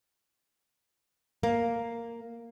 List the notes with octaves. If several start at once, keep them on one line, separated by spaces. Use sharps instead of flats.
A#3